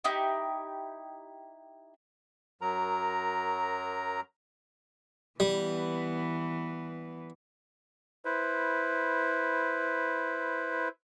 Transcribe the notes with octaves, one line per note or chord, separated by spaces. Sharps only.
D#4 E4 G4
F#2 F#3 A#4 A#5
E3 G3 B3
E4 B4 C5